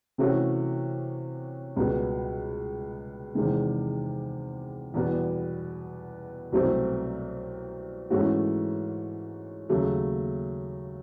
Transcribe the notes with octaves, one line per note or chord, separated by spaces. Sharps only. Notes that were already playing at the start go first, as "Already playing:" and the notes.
C3 E3 A3 C#4 F#4
C#2 B2 G3 B3
E2 C3 D#3 G#3
E2 B2 G3 B3
C2 B2 F#3 A3 C4
G#2 E3 A3 C#4 F#4
D#2 C#3 F#3 A3